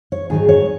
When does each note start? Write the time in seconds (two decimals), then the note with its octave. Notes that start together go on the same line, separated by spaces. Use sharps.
0.12 C#5
0.30 G#2 D#3 F#3 G#4
0.49 C#5